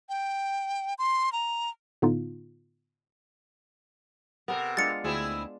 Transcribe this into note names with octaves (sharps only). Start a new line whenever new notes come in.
G5
C6
A#5
A2 D3 B3 D#4 F4
C3 B3 A4 A#4
G#3 D4 F4 A6 C#7
D2 C4 E4 G#4